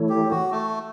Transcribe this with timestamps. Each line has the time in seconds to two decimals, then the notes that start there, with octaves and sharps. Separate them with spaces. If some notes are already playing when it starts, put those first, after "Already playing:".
Already playing: E3 A3 E4 A4 C#5
0.09 G4
0.31 F#4
0.51 A3